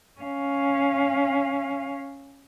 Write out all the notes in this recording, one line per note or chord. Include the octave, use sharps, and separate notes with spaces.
C#4 F5